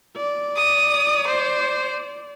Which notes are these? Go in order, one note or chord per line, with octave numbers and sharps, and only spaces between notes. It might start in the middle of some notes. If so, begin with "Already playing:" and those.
D5
D#6
C5